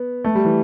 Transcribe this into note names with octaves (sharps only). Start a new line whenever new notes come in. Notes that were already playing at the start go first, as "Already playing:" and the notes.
Already playing: B3
A3
G3
E3